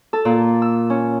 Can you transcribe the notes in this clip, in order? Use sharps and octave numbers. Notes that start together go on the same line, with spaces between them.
A4
A#2
E6
C#4